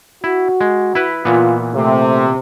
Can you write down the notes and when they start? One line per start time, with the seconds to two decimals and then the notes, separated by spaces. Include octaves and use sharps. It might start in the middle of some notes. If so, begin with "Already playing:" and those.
0.24 E4 F#4
0.61 G#3
0.95 E4 B4
1.25 A#2 E3 B3 F4
1.75 C3 A3